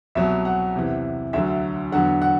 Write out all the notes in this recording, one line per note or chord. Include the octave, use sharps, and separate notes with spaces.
C2 B2 F#3 E5
F#5
E2 C3 E3
D2 D3 F#3 E5
E2 D3 F#3 F#5
F#5